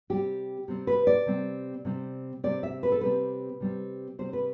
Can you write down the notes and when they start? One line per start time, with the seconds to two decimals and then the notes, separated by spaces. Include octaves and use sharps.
0.10 C3 G3 C4 G4
0.68 C3 G3 C4
0.87 B4
1.07 D5
1.26 C3 G3 C4
1.85 C3 G3 C4
2.44 C3 G3 C4 D5
2.63 E5
2.83 B4
2.92 A4
3.01 C3 G3 C4 B4
3.60 C3 G3 C4
4.19 C3 G3 C4 C5
4.33 B4